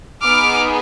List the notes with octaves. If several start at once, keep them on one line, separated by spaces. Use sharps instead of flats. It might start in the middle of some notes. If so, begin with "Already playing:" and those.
B3 D#4 G#4 D6 F6